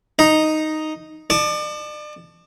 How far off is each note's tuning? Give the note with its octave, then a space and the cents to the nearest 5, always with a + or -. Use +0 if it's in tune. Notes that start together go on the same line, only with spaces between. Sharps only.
D#4 +0 D#5 +0 A#5 +0
D5 +40 A5 +0 C#6 +40